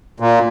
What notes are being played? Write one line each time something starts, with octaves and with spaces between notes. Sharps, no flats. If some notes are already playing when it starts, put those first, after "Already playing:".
A#2